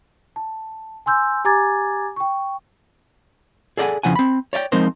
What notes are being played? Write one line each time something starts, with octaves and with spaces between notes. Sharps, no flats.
A5
G#5 C6 E6 G6
G4 G#5 A#5 D6 G#6 A6
G5 C#6
G#4 A4 D5 D#5 F#5 G#5
F2 C#3 F3 E4 F#5 G#5
C4 B5
C#5 D5 E5 G5
F3 G#3 C4 D#4 A#4 C5